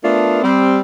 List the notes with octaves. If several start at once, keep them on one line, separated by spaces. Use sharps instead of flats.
A3 B3 D4 F4 A#4
G3 C4